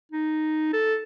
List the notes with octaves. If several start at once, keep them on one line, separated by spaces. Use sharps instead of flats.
D#4
A4